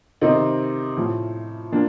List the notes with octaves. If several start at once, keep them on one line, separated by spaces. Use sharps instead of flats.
C3 D#3 C4 D#4
A2 F3
F3 A#3 D4